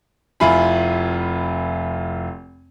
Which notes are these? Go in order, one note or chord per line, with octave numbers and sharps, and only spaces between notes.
F1 E4 F4 G#5 B5